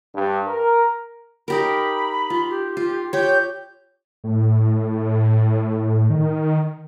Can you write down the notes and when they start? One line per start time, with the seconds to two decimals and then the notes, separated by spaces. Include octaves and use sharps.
0.16 G2
0.47 A#4
1.48 D#4 G4 A#4 B5
2.30 F4
2.50 G4
2.77 F4
3.13 G4 C#5 G6
4.24 A2
6.10 D#3